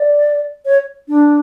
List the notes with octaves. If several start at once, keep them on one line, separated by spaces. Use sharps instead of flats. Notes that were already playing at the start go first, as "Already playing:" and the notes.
Already playing: D5
C#5
D4